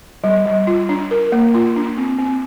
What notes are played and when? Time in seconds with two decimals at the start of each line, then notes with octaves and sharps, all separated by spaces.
0.24 G3
0.46 G3
0.67 F4
0.89 D4
1.11 A#4
1.32 A#3
1.54 F4
1.76 D4
1.98 C4
2.19 C4